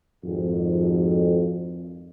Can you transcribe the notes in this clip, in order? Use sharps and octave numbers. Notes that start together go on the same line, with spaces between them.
G#1 F2